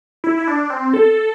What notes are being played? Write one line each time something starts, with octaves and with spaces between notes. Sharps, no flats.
E4
E4
D4
C4
A4